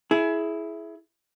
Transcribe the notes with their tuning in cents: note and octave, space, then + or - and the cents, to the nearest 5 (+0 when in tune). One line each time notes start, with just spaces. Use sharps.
E4 +0 G#4 +20